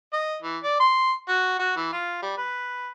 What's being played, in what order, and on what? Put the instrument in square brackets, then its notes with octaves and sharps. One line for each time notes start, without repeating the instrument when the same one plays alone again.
[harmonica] D#5
E3
D5
C6
F#4
F#4
E3
F4
G3
B4